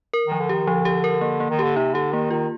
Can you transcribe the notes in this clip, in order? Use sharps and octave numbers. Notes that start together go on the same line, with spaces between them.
A#4
D#3 F3
D3
D#3 G4
D3 F3
G4
A#4
A#3
A#3
D#3
D3 G4
C3 D#4
D3 G4
D#3 A#3
D#3 F4